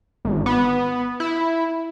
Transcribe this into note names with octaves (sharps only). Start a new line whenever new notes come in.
G#1
B3
E4